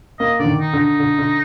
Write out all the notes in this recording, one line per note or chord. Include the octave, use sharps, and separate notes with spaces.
A#3 D#5
D3 D5
D#3
D#4
D3
D#4
D3
D3